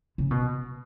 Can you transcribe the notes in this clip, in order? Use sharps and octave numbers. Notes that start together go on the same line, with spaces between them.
C#3
B2